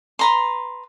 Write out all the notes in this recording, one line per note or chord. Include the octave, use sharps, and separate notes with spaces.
B4 A#5 C6